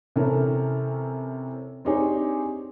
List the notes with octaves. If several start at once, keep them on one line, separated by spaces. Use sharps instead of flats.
C3 E3 C#4 A4 A#4
C4 D4 D#4 G4 G#4 C#5